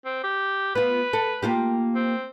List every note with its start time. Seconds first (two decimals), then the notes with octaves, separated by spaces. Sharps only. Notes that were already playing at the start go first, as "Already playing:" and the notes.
0.05 C4
0.24 G4
0.75 B3 F4 B4
1.13 A4
1.42 A#3 F4 G4
1.95 C4